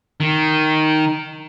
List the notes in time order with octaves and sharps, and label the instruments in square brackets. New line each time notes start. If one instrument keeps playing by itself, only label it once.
[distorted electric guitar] D#3